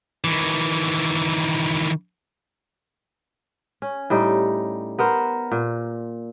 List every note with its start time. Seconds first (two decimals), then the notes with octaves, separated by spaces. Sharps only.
0.24 D#3 E3
3.82 C#4
4.10 A2 G3 D#4
4.99 B3 A#4 C5
5.51 A#2